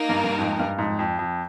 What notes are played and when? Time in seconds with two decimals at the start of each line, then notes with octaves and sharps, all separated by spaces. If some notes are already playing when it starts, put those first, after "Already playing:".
Already playing: A#3 D#4 A#4
0.09 G2
0.24 G2
0.39 F2 G#2
0.59 G2
0.78 F2 G#2
0.99 F2
1.19 F2